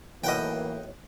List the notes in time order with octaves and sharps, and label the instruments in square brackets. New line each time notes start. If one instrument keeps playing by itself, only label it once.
[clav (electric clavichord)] B1 A2 [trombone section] E3 [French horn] A#3 [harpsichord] D#5 F#5 G5